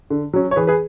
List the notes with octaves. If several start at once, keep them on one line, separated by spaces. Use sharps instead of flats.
D3
F#3 C#4
C#5
E3 G#4 B4
G#4 B4